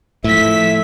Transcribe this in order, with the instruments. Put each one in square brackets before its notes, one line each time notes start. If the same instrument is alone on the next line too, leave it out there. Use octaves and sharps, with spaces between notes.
[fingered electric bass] A2 [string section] F3 B6 [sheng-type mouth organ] E5